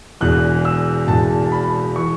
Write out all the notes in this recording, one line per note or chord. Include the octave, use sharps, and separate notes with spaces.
E1 E2 E3 F#6
E6
E1 E2 E3 A5
A5
B5
E3 C#6